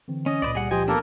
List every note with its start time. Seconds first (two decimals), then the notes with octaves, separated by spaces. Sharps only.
0.08 D3 E3 C4
0.26 C#4 D#5
0.42 C#2 A#2 B4 C5 D5
0.55 G3 G#4 F#5
0.71 F3 G4 C5 D#5 G#5
0.88 A#3 B3 D4 A4 A#4